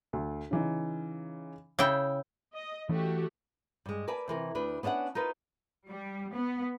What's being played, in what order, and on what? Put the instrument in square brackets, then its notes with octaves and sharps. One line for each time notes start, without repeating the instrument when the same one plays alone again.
[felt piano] D2
C#3 E3 D#4
[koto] C#3 E4 G5 [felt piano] G6
[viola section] D#5
[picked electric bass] E3 C#4 [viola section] A3 F#4 G4
[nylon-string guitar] G2 G#3
A#4 B4 D5 G#5 A5
C3 E3 A#4
D2 D4 B4
B3 C#4 D4 F5 F#5
D#4 F4 A#4 B4
[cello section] G3
B3